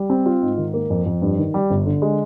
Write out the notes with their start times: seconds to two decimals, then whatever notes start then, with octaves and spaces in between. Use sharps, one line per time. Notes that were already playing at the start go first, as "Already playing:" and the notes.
Already playing: G3
0.10 C4
0.26 F4
0.42 G#2
0.58 D#3
0.74 A#3
0.90 F2
1.06 F2
1.22 G2
1.38 D#3
1.54 G3
1.70 G1
1.86 D3
2.02 G#3